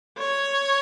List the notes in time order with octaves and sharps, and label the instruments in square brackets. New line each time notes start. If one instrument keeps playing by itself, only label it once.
[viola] C#5